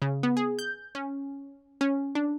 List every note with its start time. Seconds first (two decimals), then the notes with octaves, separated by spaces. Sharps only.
0.02 C#3
0.23 B3
0.37 G#4
0.59 G6
0.95 C#4
1.81 C#4
2.15 D4